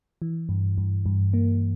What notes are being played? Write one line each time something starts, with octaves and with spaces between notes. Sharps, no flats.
E3
G2
G2
G2
A#3